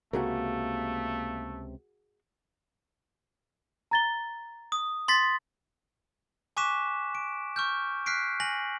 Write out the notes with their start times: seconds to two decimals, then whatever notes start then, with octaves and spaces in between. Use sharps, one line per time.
0.13 C#2 C3 A3 A#3 F#4 G#4 A#4
3.91 A#5 A6 G7
4.72 D#6
5.08 C6 A6 B6
6.57 G#5 C#6 D6 F#6 B6 E7
7.15 D7
7.56 C#6 F6 G6
8.06 F6 F#6 B6 C7 D7
8.40 G#5 A#6 F#7